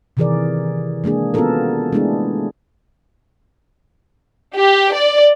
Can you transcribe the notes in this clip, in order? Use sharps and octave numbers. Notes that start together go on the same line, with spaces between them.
C3 D#3 E3 G#4 A#4 D5
G#3 A#3 D4 G#4
B3 C#4 F4 F#4 A4 A#4
G#3 A3 B3 D4 E4 G#4
G4
D5